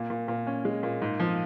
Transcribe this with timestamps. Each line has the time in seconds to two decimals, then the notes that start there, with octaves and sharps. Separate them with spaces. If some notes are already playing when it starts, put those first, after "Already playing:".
Already playing: A#2 A#3
0.10 A#2
0.28 A#2
0.47 C#4
0.65 G#3
0.83 A#2
1.02 G#2
1.20 F3